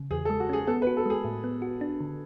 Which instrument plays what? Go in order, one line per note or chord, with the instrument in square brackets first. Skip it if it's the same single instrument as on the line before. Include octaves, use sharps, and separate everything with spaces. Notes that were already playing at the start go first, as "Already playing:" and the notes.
Already playing: [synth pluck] C#3
[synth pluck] E2 [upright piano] G#4
[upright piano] A4
[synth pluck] G#3
[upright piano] F#4
[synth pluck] C#4 [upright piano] G#4
[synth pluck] B3 [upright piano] A4
[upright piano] B4
[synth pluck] F#4
[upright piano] A4
[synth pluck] G#3 [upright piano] G#4
[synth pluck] A2
B3
F#4
D4
D3